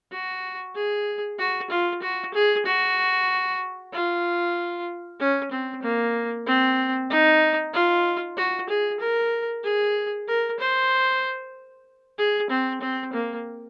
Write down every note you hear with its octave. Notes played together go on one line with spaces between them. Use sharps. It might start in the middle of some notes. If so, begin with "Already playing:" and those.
F#4
G#4
F#4
F4
F#4
G#4
F#4
F4
C#4
C4
A#3
C4
D#4
F4
F#4
G#4
A#4
G#4
A#4
C5
G#4
C4
C4
A#3